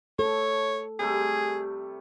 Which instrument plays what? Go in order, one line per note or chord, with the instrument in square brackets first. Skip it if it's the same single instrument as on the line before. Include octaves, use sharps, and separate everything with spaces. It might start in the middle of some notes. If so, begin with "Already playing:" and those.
[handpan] A4 [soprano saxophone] C#5
[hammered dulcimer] C3 G3 A3 [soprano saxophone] G#4